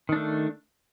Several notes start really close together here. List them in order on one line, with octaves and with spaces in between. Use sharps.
D#3 D4 A3